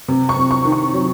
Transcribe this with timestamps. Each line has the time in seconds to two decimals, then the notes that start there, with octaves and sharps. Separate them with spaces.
0.08 C3
0.29 C#6
0.37 C3
0.51 C#6
0.65 D#3
0.72 C#6
0.93 F#3